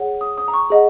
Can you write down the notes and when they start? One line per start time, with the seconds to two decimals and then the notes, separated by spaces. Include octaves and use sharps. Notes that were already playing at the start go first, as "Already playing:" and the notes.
Already playing: G#4 C#5 F#5
0.21 D#6
0.38 D#6
0.48 A#5
0.54 C#6
0.70 G#4 D#5 F#5